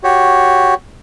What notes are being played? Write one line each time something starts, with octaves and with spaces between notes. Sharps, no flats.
F#4 G4 C#5